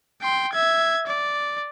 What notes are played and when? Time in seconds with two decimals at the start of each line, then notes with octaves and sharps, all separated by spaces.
0.22 G5 C6
0.53 E5 G#6
1.07 D5